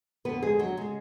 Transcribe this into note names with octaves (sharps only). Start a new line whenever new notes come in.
F2 D3 B3 B4
G#3 G#4
F#3 F#4
C#3 G#3 G#4